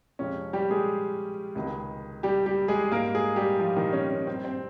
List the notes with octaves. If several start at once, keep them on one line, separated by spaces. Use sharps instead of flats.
F2 C3 F3 G#3 C#4
G3 G4
G#3 G#4
C#2 C3 D#3 G#3
G3 G4
G3 G4
G#3 G#4
G#2 G3 A#3 A#4
G#3 G#4
G3 G4
F3 F4
D#3 D#4
C#4
C#4
G2 G3 C4
C4